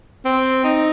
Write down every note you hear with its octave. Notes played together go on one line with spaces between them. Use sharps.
C4
D#4